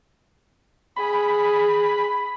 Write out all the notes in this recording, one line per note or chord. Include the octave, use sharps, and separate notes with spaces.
G#4 B5